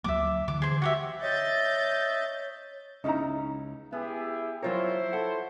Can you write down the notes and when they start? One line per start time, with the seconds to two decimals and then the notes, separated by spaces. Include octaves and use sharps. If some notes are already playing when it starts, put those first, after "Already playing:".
0.04 D2 F#3 A#3 E5 D6
0.48 D3 E3 D6
0.62 G#4 C5
0.82 F#4 G4 E5
1.22 C#5 D#5 E5 G6 A6
3.04 C#2 C#4 D#4 E4 A#5
3.93 B3 E4 G4 G#4 E5
4.63 F#3 E4 F4 A#4 C5 C#5
5.13 A4 F#5